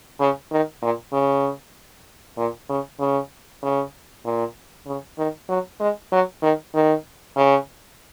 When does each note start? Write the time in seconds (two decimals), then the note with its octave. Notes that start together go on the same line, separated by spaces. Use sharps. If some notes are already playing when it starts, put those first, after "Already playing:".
0.20 C#3
0.51 D#3
0.82 A#2
1.13 C#3
2.38 A#2
2.69 C#3
3.00 C#3
3.63 C#3
4.25 A#2
4.87 C#3
5.18 D#3
5.49 F#3
5.80 G#3
6.12 F#3
6.42 D#3
6.74 D#3
7.37 C#3